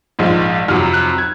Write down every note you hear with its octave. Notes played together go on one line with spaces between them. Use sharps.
A#1 G#2 F3 G#3
F2 C3 F#3 F6
F#6
G#6